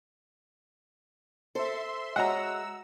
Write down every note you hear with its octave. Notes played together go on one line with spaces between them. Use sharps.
A4 C5 E5 C6
G#3 F#4 C#5 D#5 E5 F#5 A#5 E6